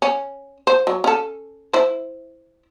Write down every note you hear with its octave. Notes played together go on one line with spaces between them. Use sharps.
C#4
C5
F#3
C#4 A4
E4 C5